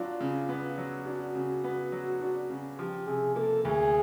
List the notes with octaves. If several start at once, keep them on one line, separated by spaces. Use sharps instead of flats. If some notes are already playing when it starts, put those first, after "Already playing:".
Already playing: F#3 B3 D4 F4
C#3
B3
F#3
D4 F#4
C#3
B3
F#3
D4
C#3
F3 G4
C3 G#4
A#3 A4
D2 G#4